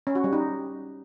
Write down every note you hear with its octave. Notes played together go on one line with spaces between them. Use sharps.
C#4
F#4
G3
D#4